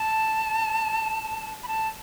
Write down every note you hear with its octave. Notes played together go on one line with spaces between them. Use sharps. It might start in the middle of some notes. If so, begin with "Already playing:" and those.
Already playing: A5
B5
A5